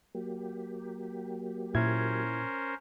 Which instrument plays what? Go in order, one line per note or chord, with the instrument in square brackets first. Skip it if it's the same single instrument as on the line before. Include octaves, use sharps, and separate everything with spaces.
[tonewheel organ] F#3 A#3 G4
[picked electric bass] A#2 [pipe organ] C#4 A#4 C5 [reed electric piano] E4 G#6